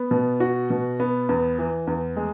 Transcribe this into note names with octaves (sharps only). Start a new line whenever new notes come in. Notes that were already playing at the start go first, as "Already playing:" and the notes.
Already playing: B3
B2
F#4
B2
B3
E2
E3
E2
G#3